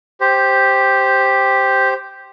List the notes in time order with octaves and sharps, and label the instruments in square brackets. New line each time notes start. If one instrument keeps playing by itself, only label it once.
[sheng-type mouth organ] G4 C5